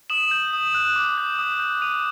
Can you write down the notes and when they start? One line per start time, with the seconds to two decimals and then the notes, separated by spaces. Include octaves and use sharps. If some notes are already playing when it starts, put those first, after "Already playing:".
0.10 D#6 E7 F#7
0.31 G6
0.53 D#6
0.75 F#6
0.96 D6
1.18 G6
1.39 D#6
1.60 G6
1.82 D#6 D#7 F7